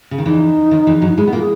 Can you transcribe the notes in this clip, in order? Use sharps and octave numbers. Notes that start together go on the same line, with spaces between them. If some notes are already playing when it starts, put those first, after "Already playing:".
C#3
D#3
E2 E3 D#4
D#2 D#3
E2 E3
F#2 F#3
D#4
G#2 G#3 E4
B3
A#2 A#3
G#4